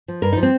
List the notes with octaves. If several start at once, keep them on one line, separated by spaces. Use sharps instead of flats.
F3
G2 A#4
F3 D#4
C4